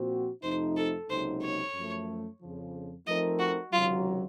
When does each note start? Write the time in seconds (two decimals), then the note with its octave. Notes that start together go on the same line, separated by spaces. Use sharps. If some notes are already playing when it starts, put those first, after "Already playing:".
Already playing: A#2 F3 C4 F#4 C5
0.43 F2 C3 F3 A3 D#4 C5
0.76 A4
1.09 C#2 C3 F#3 A#3 D#4 C5
1.42 C#5
1.74 F#2 F3 A3
2.41 F2 C#3 F3
3.07 F3 A3 C4 D#4 A#4 D#5
3.39 F#4
3.72 C#2 C3 D#3 F#3 F4